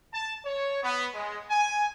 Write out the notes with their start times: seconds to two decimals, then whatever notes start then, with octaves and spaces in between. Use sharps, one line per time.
0.13 A5
0.45 C#5
0.82 B3
1.14 G#3
1.50 G#5